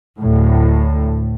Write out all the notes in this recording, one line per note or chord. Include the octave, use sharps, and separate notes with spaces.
D2 A2